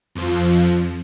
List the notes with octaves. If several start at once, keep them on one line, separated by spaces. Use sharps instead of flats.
F2 F3